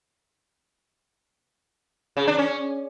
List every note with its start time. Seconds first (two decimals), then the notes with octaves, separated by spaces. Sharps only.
2.17 C#3
2.27 D4
2.38 C#4